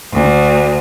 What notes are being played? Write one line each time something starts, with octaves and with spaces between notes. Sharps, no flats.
D2